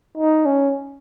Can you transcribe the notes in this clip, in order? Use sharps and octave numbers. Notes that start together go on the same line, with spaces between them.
D#4
C#4